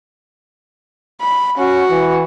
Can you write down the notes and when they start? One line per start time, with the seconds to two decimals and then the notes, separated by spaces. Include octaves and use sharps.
1.21 B5
1.58 C#4 F#4
1.90 E3